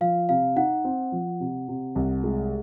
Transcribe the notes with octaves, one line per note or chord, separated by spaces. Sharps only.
F3 F5
C3 F5
D#4 F#5
C4
F3
C3
C3
C2
G#3